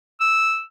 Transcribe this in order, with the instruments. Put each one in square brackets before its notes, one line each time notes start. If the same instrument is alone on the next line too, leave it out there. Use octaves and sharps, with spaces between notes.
[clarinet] E6